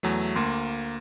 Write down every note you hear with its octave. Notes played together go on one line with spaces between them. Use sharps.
E2 F#3 A3
D2 A#3 C6